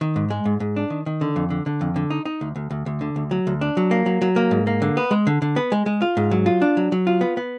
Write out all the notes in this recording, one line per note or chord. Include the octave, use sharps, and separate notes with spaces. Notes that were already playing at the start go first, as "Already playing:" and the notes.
D#3
G#2
G#3
G#2
G#2
D4
D#3
D#3
D3
F2
D3
D3
F2
D3
D#4
D#4
D2
D2
D2
D2
D3
D2
F#3
D2
D4
F#3
A#3
F#3
F#3
A#3
G#2
A#3
D3
B3
G#3
D3
D3
B3
G#3
G#3
F4
G#2
F#3
F4
D4
F#3
F#3
F4
B3
B3